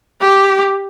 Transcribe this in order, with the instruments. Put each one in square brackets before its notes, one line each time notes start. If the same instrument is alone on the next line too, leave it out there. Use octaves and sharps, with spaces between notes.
[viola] G4